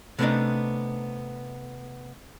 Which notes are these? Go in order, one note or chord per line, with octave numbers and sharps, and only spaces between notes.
C3 A3 B3 C4 D4 D#4